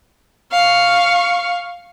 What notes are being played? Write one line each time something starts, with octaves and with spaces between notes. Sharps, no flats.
F5 C#6